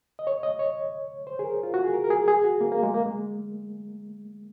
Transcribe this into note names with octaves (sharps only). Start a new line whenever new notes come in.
D#5
C#5
D#5
C#5
C5
G#4
A#4
F4
F#4
G#4
A#4
A#4
G#4
G#4
F#4
A#3
A#3
G#3
A#3
G#3